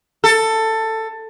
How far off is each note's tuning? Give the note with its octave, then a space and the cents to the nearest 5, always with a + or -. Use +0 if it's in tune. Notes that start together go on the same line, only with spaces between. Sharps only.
A4 +15